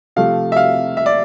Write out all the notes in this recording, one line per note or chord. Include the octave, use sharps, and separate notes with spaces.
C3 F3 A3 F5
E5
F5
E5
D5